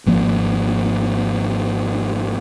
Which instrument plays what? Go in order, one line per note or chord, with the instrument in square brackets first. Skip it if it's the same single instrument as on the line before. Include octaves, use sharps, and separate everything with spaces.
[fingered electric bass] G#1 F3 A#3